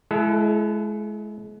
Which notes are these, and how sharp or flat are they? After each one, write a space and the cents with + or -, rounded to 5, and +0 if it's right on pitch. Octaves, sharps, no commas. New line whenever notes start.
G#3 +35 E4 +25 A4 +0